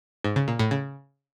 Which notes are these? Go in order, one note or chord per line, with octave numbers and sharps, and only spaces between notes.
G#2
C#3
A#2
A2
C#3